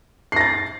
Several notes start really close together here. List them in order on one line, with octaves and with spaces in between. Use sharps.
C7 A#6 A6